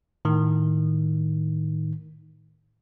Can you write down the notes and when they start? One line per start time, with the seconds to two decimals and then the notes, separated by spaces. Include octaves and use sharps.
0.25 A2 D#3